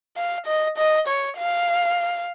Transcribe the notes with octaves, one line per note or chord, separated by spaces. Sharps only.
F5
D#5
D#5
C#5
F5